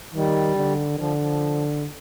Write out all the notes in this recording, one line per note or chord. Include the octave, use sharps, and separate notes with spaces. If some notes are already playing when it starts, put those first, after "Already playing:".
D#3 G3
D3
D#3
D3 F3
F3